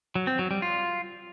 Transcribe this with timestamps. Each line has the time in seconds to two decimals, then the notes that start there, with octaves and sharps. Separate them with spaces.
0.15 F#3
0.27 C4
0.39 F#3
0.51 G3
0.62 F4